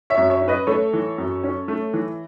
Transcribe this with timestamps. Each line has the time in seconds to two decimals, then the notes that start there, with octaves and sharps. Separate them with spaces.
0.10 C#5 E5
0.17 F#2
0.30 C#5 E5
0.42 C#4
0.48 B4 D#5
0.67 A3 A4 C#5
0.93 E3
1.18 F#2
1.44 C#4
1.68 A3
1.94 E3